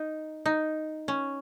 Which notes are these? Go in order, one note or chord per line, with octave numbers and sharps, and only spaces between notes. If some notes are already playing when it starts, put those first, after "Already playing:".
Already playing: D#4
D#4
C#4